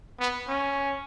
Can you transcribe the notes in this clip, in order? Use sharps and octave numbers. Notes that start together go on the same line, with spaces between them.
B3
C#4